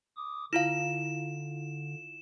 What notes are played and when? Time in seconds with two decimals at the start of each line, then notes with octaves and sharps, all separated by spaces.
0.17 D6 D#6
0.53 D3 E4 F4 F5 E7